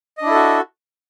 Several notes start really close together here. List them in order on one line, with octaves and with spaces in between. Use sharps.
D#5 D4 E4 A4 F#4